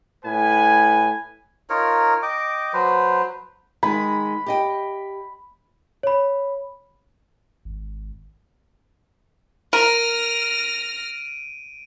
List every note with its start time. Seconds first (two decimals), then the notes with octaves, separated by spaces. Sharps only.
0.25 A2 B4 G#5
1.69 D#4 F4 A#4 C#5
2.22 D#5 G5 D6
2.73 F#3 B4 C5
3.83 D#3 G#3 B5
4.46 G4 D#5 G5
6.03 C#5 B5
7.65 G#1
9.73 A#4 F6 A#6 D7 D#7